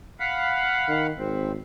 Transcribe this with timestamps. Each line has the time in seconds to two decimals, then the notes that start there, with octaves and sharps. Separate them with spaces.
0.20 F5 F#5 B5
0.88 D#3
1.18 G#1 C4